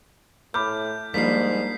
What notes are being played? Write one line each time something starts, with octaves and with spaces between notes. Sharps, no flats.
A2 B5 D6 F6 G6
G#2 F3 G3 A#3 D4 B6 C7